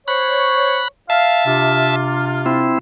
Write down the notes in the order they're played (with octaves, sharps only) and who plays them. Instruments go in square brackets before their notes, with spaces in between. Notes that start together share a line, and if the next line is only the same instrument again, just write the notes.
[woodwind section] C5 C#5 C#6 [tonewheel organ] B5 F#6
[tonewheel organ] E5 A5 [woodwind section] F5
[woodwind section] C3 D4 F4
[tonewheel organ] C4 E4